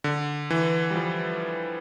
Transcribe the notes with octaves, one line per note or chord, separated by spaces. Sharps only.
D3
E3
G3
F3